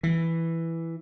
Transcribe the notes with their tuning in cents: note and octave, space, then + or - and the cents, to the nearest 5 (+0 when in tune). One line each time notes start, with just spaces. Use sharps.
E3 +0